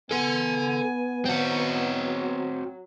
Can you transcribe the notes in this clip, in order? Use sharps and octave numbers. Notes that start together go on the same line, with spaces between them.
B3 A4 F#5 G#5
F#3 C4 F#4